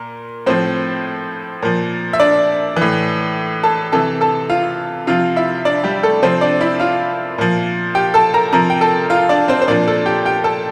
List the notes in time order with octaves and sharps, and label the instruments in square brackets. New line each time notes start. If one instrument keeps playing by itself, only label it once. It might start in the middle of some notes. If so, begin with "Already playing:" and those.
Already playing: [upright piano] A#2 A#4
A2 F3 C4 C5
A#2 F3
E5
D4 D5
A2 E3
A4 A5
C3 E3 A4 A5
A4 A5
F4 F5
C3 F3 F4 F5
E4 E5
D4 D5
G3 G4
A3 A4
C3 F3 C4 C5
D4 D5
E4 E5
F4 F5
A#2 F3
G4 G5
A4 A5
A#4 A#5
C3 F3 A#4 A#5
G5
A4 A5
F4 F5
D4 D5
C4 C5
C5
A#2 F3 D4 D5
A4 A5
G4 G5
G4 G5
A4 A5